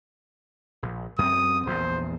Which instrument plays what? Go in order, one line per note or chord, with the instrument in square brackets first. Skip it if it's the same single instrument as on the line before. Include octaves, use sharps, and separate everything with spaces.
[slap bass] A#1
[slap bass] F#2 C4 [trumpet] D#6
[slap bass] A#1 E2 [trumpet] C5